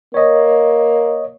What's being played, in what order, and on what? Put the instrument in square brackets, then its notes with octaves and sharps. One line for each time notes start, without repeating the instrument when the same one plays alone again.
[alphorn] A#3 [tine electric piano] C#5 D#5